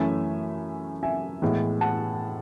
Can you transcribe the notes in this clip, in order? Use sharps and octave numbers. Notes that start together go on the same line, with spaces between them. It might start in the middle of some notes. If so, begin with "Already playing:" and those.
Already playing: F#2 E3 A3 C#4 E5 G#5
E5 G#5
A2 E3 G#3 B3
F#5 A5